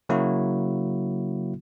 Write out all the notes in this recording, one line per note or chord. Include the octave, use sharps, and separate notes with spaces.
C#3 F#3 A#3 E4 F#4